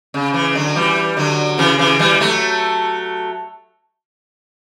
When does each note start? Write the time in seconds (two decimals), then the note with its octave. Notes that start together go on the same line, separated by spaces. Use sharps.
0.14 C#3
0.34 C#3 E3
0.55 D3 F#3
0.75 E3 G3
1.17 D3 F#3
1.58 C#3 E3
1.78 C#3 E3
1.99 E3 G3
2.21 F#3 A3